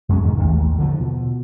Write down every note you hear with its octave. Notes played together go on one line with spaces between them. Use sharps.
F#2 G#3 C#4
E2 G#2 B2 D#3
A1 D#2 A2
D3 E3 F3
B2